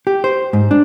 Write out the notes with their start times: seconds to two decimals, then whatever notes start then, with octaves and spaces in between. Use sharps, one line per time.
0.07 G4
0.24 C5
0.53 G#2
0.71 D4